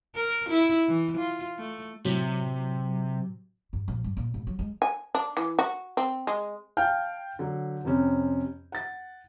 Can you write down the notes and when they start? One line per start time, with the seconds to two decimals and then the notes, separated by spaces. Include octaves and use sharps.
0.15 A#4
0.49 E4
0.88 E3
1.17 F4
1.58 A3
2.05 A2 C3 F#3
3.73 G2
3.88 A#1
4.04 G2
4.17 A#2
4.34 A2
4.47 F#3
4.59 G#3
4.82 G#5
5.15 D4
5.37 E3
5.59 F#4
5.97 C4
6.27 G#3
6.77 F5 G5 A5 F6 G6
7.39 D3 F#3
7.84 F2 C3 C4 C#4
8.72 F#5 A6